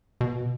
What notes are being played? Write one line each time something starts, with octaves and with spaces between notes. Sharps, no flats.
B2